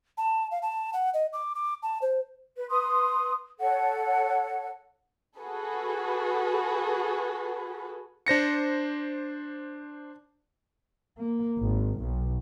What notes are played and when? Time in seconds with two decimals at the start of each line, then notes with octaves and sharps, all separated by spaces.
0.18 A5
0.51 F5
0.62 A5
0.93 F#5
1.14 D#5
1.33 D6
1.55 D6
1.83 A5
2.02 C5
2.58 B4
2.69 B4 C6 D#6
3.60 A4 C#5 F#5
5.38 F#4 G#4 A4 B4
8.26 D4 C5 A#6 C#7
11.18 A#3
11.58 G#1
12.00 B1